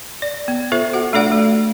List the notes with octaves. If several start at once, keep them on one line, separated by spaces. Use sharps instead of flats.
D5
B3
F4 A4 C5 E5
F#4 F#5
A3 D4 A4 D5 F#5
A3